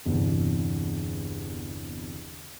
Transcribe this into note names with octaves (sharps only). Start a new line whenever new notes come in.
G1 E2 C3